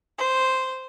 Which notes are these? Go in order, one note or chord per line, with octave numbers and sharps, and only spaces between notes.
C5